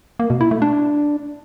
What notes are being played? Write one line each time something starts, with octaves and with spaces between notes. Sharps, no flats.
A#3
B2
E4
A3
D4